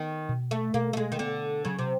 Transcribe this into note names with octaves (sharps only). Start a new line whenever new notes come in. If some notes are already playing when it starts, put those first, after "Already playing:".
Already playing: D#3 B3
B2
A3
B2 A#3
A3
G#3
D#3
D3 B3
C#3 F#3
C3